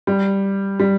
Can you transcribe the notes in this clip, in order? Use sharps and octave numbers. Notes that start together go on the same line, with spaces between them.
G3
G3